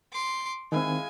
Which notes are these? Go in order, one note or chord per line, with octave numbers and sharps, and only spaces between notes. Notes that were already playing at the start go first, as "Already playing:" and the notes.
C6 D6
D#3 G#3 C4 E4 F5 G#5